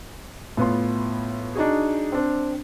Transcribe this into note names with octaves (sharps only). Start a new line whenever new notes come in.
A2 B3 F4 C6
D4 D#4 F#4 G#4
C4 D4 C5